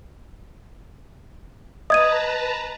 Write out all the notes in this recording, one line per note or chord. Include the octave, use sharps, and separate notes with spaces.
B4 D#5 A5 A#5 D#6 G#6 D#7